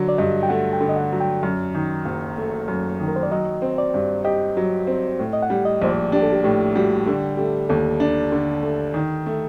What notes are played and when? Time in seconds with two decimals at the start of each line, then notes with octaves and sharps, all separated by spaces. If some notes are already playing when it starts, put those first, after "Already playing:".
Already playing: D3 F#3
0.09 D5
0.18 G2 D#5
0.43 G5
0.49 A3 F#5
0.73 G5
0.81 D3
0.89 D#5
0.96 F#5
1.12 F#3
1.20 G5
1.43 F#2
1.75 D#3
2.05 F#1
2.38 A3
2.68 F#2
3.00 D#3
3.08 A#4
3.16 C5
3.23 D5
3.31 F#3 D#5
3.62 C4
3.78 D5
3.94 G2
4.25 G4 D#5
4.57 F#3
4.87 C4
5.19 A2
5.33 D#5
5.42 F#5
5.50 G3
5.65 D#5
5.82 A#1 C5
5.89 D5
6.12 D4 G4
6.23 A4
6.32 G4
6.44 A2 G4
6.75 G3 F#4
7.06 D3 G4
7.37 A3 G4
7.69 D#2 A4
8.00 D4
8.32 D3
8.63 A3
8.94 D#3
9.26 A3